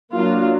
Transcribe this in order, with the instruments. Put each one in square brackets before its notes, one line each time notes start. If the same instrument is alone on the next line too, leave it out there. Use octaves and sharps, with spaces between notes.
[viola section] F#3 A#3 D4 F4